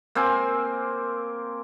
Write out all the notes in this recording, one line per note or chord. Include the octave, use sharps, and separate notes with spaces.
A#3 C4 C5 G#5